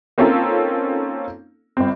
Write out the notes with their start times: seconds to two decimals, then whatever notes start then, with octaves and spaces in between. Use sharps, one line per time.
0.18 A#3 C4 C#4 D#4 F4 A4
1.77 G1 C4